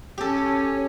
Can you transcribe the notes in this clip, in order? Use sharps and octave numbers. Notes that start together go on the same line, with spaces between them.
C#4 G4 A4